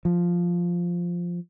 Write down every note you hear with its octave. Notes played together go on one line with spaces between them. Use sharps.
F3